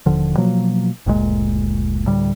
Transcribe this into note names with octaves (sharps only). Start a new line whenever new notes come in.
D#1 D3 F3
B2 F3 F#3 A#3
F#1 D2 A#2 G#3
D2 A2 G3